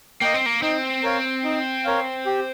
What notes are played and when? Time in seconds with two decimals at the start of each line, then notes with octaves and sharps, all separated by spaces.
0.21 A#3 D#5 G5
0.34 C4
0.46 A#3
0.62 C4 D#4
1.03 A#4 C#5 F5
1.44 D#4
1.85 A#4 C#5 F5
2.26 G4